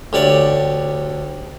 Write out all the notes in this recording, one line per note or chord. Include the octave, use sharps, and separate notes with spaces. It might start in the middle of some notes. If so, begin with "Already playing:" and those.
D2 G4 C#5 D5